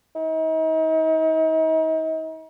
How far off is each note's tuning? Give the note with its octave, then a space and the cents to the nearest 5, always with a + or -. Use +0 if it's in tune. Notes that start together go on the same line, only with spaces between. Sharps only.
D#4 +40